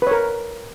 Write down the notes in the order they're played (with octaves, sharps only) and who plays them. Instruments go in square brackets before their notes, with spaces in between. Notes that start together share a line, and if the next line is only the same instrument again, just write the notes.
[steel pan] B4
C#5
A#4